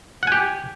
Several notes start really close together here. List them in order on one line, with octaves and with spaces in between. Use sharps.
F#5 G#5 G4